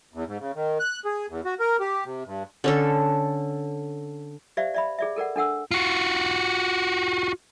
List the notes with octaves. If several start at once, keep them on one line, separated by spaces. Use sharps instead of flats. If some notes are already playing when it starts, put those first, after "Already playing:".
E2
G#2
C#3
D#3
F#6
G#4
E2
F#4
A#4
G4
C3
G2
D3 C#4 A4
G4 C5 D5 E5 F5
D5 E5 B5
G#4 D5 E5
A4 A#4 D5 F#5
D4 A4 F#5 E6
F4 F#4